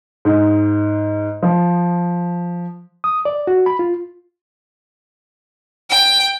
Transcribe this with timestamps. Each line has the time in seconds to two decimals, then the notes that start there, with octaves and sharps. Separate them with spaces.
0.25 G#2
1.43 F3
3.04 D#6
3.25 D5
3.47 F#4
3.66 B5
3.79 F4
5.90 G5